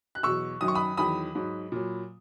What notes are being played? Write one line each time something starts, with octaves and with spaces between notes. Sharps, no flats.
F#6
E2 B2 F#3 C#6 E6
F#2 D#3 F#3 D#6
C#6
B5 D#6
E2 D#3 F#3 B5 D#6
G#2 F#3
A#2 F#3